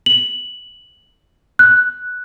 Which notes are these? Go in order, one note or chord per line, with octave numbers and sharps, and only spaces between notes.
F#7
F#6